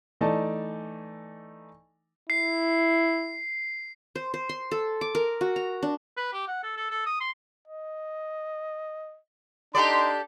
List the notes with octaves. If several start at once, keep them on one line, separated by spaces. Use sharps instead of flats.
E3 A3 D#4 D5 A5
E4 C7
C5
C5
C6
A4
D6
A#4
F#4
A#5
D4
B4
G4
F#5
A4
A4
A4
D#6
C6
D#5
D4 D#4 G4 A4 D5 C6